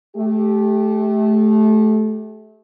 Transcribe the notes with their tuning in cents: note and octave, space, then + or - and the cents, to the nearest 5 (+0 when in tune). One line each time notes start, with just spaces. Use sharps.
A3 -25 G4 +0